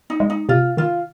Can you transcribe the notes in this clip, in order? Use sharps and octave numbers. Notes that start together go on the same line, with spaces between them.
D#4
G#3
D#4
C3 F4
D#3 F4